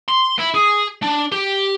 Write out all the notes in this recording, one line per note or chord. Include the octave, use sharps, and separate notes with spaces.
C6
E4
G#4
D4
G4